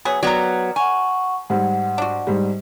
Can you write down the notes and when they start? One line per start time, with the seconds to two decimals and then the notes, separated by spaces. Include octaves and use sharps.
0.05 F#3 B3 G#4
0.23 F#3 B3 G4 A#4 D5
0.76 F#5 G#5 C#6
1.50 G#2 G3 F#5
1.98 D4 F#4
2.27 G#2 G3